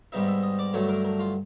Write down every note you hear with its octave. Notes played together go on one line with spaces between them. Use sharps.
G#2 D#3 G3 B3 D#4 E5
E5
D#5
D5
G2 D3 F#3 A3 C#5
A#4
A#4
F4